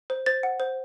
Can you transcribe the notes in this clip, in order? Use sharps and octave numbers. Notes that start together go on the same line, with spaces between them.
C5
C5 A6
F#5
C5